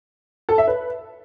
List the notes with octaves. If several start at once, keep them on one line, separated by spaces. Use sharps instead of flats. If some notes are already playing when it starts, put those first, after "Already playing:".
A4
E5
B4